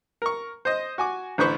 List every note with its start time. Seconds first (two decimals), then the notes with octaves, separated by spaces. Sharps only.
0.22 A#4 C#6
0.65 C5 D#5
0.98 F#4 G#5 D6
1.38 A1 D3 B4 C5 B5 C#6